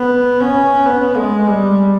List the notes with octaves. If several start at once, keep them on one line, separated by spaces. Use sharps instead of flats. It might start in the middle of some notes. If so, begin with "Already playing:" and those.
Already playing: B3
C#4
B3
G#3
G3